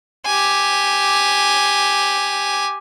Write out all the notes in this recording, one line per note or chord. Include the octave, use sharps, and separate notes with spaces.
G4 G#5